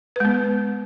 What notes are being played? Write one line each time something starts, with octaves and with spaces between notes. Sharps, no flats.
G#3 B3 B4